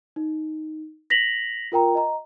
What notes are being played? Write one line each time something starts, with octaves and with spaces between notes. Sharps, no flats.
D#4
A#6 B6 F7 F#7
F4 A#4 G5 A#5
D#5 A#5